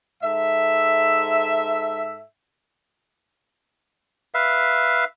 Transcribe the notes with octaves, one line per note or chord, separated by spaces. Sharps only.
G#2 A4 E5
B4 E5 F5